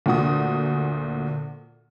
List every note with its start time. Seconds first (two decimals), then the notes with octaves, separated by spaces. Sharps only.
0.06 D2 A#2 F#4 D#6